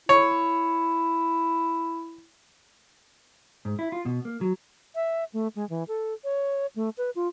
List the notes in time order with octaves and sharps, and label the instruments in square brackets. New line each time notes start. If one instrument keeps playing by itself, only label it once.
[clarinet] E4 [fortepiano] C#5
[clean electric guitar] G#2
E4
F4
B2
A#3
F#3
[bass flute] E5
A3
G#3
E3
A4
C#5
A3
B4
F4